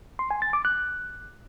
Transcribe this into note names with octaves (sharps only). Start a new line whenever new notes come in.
C6
G#5
A6
D6
F#6